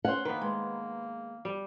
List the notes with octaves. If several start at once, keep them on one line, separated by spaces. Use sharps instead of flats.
C#4 C5 F#5
D#3 A#3 B3 B4
G#3
G3